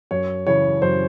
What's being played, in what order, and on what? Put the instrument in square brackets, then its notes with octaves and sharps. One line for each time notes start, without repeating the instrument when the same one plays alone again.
[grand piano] F#2 C#5
C#3 E3 C#5
F#2 C5